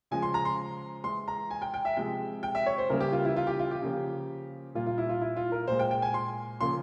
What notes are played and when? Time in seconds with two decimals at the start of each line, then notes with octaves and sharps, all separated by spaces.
0.11 C#3 F3 G#3 G#5
0.22 C6
0.34 A#5
0.45 C6
1.04 E3 G#3 C6
1.28 A#5
1.50 G#5
1.62 G5
1.74 G5
1.85 E5
1.97 C3 F3 G#3 G5
2.43 G5
2.55 E5
2.66 C#5
2.78 C5
2.90 C#3 E3 G3 A#3 A#4
3.00 G4
3.12 F4
3.25 E4
3.36 F4
3.47 G4
3.60 F4
3.71 G4
3.82 C#3 F3 A#3
4.75 A#2 G3 A#3 F4
4.86 F4
4.98 E4
5.09 F4
5.21 E4
5.36 F4
5.52 A#4
5.67 A#2 G#3 C5
5.79 G5
5.91 G5
6.02 G#5
6.14 C6
6.61 C#3 F3 A#3 C6